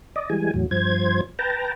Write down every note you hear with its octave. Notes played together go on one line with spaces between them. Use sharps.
D5 D#5
E3 G3 G#3 G#5
E2 A2 F#3
G2 F3 C5 G#6
B4 G5 A5 A#5